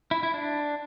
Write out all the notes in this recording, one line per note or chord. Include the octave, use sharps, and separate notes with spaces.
E4
E4
D4